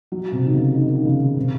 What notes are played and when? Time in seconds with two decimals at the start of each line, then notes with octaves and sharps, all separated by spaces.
0.12 F#3
0.32 C3
0.46 D#3
0.54 C#3
0.74 D#3
0.95 D#3
1.05 C#3
1.37 C3